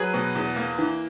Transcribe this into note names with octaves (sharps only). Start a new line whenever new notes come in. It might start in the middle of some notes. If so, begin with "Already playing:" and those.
Already playing: F#3 G#4 B4
B2
E2
A#3
E3